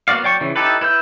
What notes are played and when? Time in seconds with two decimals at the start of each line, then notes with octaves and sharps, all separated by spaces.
0.08 A#3 B3 F#4 D5 F5
0.23 F#3 D5 G5 C#6
0.41 C#3 E3
0.56 D#4 E4 G4 A4 B4
0.81 E4 B4 E6 G6